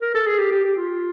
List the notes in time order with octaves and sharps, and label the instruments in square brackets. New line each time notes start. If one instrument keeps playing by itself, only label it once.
[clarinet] A#4
A4
G#4
G4
G4
G4
F4